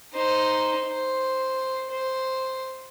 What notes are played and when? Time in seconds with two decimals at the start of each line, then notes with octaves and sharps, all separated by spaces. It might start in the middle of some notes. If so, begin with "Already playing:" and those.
0.14 D#4 C5
0.88 C5
1.90 C5